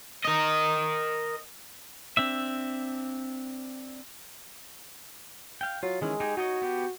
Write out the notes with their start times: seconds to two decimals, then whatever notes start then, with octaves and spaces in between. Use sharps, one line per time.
0.24 A#4 D#5
2.17 C4 D4 E5
5.61 F5 G5
5.83 F#3 F4
6.01 D#3 E3 G#3 C#4
6.20 D#4 G4 G#4
6.37 D#4 F#4 C#5 D#5
6.62 B3 G4